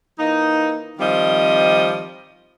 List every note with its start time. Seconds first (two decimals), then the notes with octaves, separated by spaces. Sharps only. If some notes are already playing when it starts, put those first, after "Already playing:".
0.19 E3 A#3 D#4
0.99 D#3 F3 G3 C4 D#5